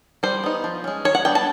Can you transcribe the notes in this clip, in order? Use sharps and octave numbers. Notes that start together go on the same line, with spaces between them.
G3 C5
B3 D#4
F3
G#3 C#4
D#3 C#5
F#5
G3 B3 D4 G5
A5